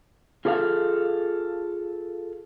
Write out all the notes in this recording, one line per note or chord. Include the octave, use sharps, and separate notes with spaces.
F4 G#4 A4 D5 F5